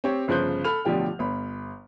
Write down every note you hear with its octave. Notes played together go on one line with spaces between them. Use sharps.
C4 G4 C#5
G1 C#3 F3 C5 F#6 G6
A4 B5 F6 F7
A1 B2 D3 F3 G4 G5
G1 B5